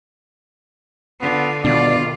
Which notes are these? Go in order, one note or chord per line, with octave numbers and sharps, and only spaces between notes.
D3 B3 F4
B2 D#3 B3 D4 F4 D5